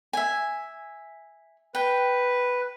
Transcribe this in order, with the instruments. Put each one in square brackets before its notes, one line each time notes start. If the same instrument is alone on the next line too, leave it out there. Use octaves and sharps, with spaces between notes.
[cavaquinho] E5 G#5
[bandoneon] B4 [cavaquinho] G5